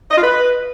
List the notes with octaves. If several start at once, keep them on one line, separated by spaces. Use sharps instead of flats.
D#5
F4
B4